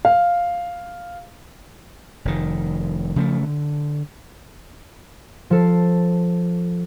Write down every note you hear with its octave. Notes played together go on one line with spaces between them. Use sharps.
F5
F1 D#3
C#3 F3 G#3 A3
D3
F3 A4 C7